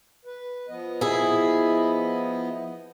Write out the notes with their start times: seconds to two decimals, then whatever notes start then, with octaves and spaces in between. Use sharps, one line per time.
0.25 B4
0.69 F3 B3 D#5
1.01 E4 G#4